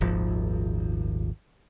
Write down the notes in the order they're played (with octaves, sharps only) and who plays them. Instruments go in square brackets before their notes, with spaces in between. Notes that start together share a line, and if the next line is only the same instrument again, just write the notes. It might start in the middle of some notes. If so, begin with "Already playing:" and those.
[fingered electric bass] D#1 G#1 F3